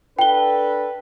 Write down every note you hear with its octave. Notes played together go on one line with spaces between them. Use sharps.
D4 A4 B4 G5 G7